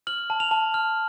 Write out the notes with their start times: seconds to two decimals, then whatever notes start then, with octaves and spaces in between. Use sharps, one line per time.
0.07 F6 F#7
0.30 A5
0.40 F7
0.51 A5
0.74 F6